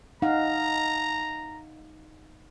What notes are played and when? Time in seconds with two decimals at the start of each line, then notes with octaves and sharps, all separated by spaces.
0.22 D#4 F5 F#5 A#5